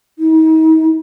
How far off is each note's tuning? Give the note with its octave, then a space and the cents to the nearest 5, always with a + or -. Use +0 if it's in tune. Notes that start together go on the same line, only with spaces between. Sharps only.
D#4 +40